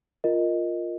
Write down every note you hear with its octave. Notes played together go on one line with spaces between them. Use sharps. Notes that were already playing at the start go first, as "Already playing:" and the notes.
F4 A#4 D#5